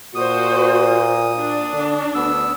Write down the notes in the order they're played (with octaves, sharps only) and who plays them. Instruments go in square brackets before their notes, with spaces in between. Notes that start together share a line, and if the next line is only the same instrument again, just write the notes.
[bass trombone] A#2 [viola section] F#4 C5 [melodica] D#6
[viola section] D4
[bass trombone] D3
[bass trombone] D2 [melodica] B3 E6